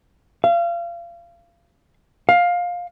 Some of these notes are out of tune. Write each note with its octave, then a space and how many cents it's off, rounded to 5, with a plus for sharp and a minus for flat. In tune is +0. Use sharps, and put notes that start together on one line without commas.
F5 -30
F5 +15